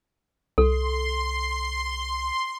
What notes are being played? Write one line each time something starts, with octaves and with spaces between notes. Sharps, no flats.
C2 A4 C6